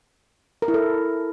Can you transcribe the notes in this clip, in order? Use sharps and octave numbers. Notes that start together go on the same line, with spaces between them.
A#4
E4
A4